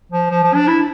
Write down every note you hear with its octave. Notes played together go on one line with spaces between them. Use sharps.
F3
F3
F3
D4
E4